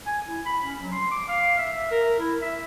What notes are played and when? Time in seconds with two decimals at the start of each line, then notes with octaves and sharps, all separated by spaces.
0.06 G#5
0.28 E4
0.46 B5
0.64 C#4
0.80 F#3
0.92 C6
1.11 D6
1.28 F5
1.58 E5
1.91 A#4
2.19 E4
2.42 E5